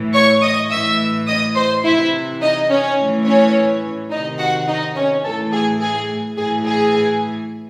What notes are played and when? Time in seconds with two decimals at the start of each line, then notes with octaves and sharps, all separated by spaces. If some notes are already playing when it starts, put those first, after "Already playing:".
Already playing: A2 E3
0.14 C#5 C#6
0.42 D#5 D#6
0.71 A2 E3 E5 E6
1.27 D#5 D#6
1.55 C5 C6
1.84 C3 E3 E4 E5
2.42 D#4 D#5
2.70 C#4 C#5
2.97 A2 E3
3.25 C#4 C#5
4.11 C3 D#3 D#4 D#5
4.39 F#4 F#5
4.68 D#4 D#5
4.96 C#4 C#5
5.24 A2 E3 A4
5.52 G#4
5.80 G#4
6.37 A2 E3 G#4
6.65 G#4